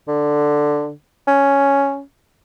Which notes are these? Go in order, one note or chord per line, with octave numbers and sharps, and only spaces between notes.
D3
C#4